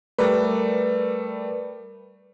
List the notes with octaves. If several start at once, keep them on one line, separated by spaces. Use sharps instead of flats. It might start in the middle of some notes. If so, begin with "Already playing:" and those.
G3 A3 A#4 B4 D5